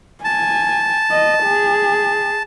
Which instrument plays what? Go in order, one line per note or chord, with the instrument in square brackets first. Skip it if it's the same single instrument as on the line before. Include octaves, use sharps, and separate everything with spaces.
[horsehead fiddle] G#5 [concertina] A5
[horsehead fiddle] D#5
G#4